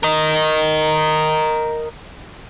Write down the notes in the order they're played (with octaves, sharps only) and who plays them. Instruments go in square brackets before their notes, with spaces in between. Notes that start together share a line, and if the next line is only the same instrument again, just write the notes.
[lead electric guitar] A#4 D#5